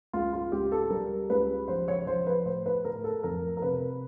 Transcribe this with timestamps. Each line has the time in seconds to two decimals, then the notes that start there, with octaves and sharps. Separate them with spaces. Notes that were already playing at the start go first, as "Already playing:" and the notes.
0.13 C#2 F4
0.33 F4
0.52 C#2 G4
0.72 A4
0.90 G3 A#4
1.30 C#2 B4
1.68 F3 C5
1.88 C#5
2.06 F3 C5
2.27 B4
2.45 A2 C5
2.66 B4
2.84 A2 A#4
3.04 A4
3.23 F2 A#4
3.57 A#4
3.62 C3 B4